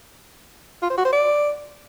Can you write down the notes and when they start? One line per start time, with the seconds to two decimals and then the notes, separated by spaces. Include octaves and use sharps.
0.83 F4
0.90 C5
0.98 F#4
1.05 C5
1.13 D5